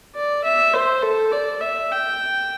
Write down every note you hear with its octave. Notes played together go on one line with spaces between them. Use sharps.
D5
E5
C5
A4
D5
E5
G5